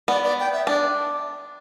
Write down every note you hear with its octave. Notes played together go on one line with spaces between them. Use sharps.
B3 D5
D5
G5
E5
D4 D5